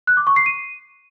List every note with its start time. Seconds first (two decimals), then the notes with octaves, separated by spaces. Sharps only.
0.07 F#6
0.17 D6
0.27 C#6
0.36 C7
0.46 D#7